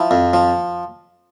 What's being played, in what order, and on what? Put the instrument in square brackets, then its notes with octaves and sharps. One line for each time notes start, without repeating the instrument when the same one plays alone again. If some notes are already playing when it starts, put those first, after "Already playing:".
Already playing: [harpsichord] F3 [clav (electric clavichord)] E4
[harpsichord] F2
F3